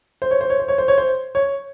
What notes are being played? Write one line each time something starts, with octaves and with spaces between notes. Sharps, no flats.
C5
C#5
C5
C#5
C5
C#5
C5
C#5
C5
C#5